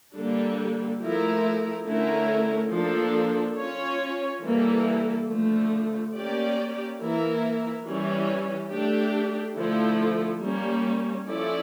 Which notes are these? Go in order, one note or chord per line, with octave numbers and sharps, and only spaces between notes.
D3 G3 A#3 D4 A4
F3 A3 E4 A#4
D3 A3 C#4 E4 A#4
F3 A#3 D4 A4
C#4 F4 C#5
E3 G3 A#3 E4 A4
D3 F3 A3
A#3 C#4 G4 D5
E3 A#3 E4 A#4
E3 G3 C#4
A3 D4 G4
D3 F3 A3 E4 A4
G3 A#3 C#4
F3 C#4 E4 A4 D5